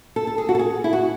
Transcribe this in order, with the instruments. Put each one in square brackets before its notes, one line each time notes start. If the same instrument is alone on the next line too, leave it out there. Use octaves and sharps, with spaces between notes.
[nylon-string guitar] A4
A4
G#4
F#4
A4
G#4
E4
F#4